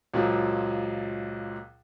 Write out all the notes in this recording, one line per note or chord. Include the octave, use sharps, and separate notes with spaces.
C#2 A#2 F3 F#3